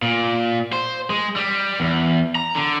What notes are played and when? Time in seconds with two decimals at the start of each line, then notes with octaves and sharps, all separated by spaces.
0.02 A#2
0.73 C5
1.10 G#3
1.36 G3
1.80 E2
2.35 A#5
2.55 D3